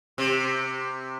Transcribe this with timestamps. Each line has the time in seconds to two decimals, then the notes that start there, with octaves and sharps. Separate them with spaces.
0.18 C3